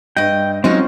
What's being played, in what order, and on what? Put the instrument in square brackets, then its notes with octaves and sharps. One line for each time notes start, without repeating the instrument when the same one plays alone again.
[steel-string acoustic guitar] G2 D#5 [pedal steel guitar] G5
[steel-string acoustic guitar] F#3 G#3 D#4 [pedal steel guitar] C4 C#4 F4